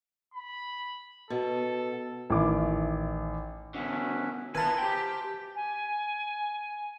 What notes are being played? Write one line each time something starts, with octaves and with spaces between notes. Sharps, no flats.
B5
B2 A4
A1 D#3 E4 D6
B2 D3 C#4 F#4 E5
E4 F4 A#4 B4 F#5 G#5 A5
G4 C5 G5
G#5